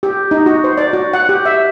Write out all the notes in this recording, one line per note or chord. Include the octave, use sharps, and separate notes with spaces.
G4
D#4
F#4
C5
D5
F#4
F#5
G4
E5